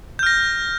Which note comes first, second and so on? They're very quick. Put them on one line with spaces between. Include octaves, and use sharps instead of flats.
G6 F6 A#6